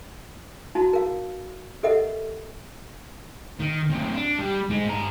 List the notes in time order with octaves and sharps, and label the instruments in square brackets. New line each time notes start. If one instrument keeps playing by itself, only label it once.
[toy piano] D#4 E4 F#4 A5
A#4 F5
G4 A4 A#4 D#5 E5 F#5
[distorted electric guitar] D#3
F#2 C3
D4
G3
G#3 D#4
G2 A#5